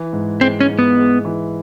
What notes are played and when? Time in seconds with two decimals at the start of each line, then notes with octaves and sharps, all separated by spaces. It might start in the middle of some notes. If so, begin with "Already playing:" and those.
Already playing: E3
0.13 G#2
0.41 G#3 C4
0.61 C#4
0.69 G#2
0.79 B3
0.97 G#3
1.25 E3